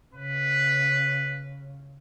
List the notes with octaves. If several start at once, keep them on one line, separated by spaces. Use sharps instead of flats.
C#3 B4